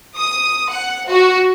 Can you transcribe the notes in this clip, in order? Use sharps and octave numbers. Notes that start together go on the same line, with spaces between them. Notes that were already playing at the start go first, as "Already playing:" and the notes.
D#6
F#5
F#4